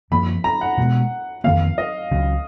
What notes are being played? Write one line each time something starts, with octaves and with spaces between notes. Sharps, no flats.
F#2 F3 A#3 B5
A#5
F#5
B2 G#3 B3
F2 D#3 A#3 F5
D#5
C#2 C#3 F#3